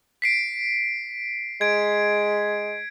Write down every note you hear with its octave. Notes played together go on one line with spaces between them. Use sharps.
B6 C7 D7
G#3 G#6 D7